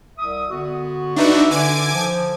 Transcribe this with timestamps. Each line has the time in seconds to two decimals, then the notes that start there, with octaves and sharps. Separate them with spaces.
0.18 C2 E5 D#6
0.50 D3 B3 F#4
1.16 D4 D#4 F#4 B4 D5 E5
1.51 D3 G#5 D6 G#6
1.94 F3